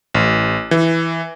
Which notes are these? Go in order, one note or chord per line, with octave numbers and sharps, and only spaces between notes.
A1
E3